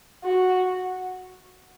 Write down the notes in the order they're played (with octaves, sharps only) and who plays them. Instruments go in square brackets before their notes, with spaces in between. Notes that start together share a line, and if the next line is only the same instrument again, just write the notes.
[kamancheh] F#4